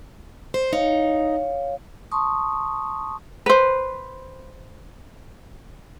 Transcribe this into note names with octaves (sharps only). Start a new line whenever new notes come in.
C5
D#4 C#5 F5
A5 C6 C#6 D#6
B4 C5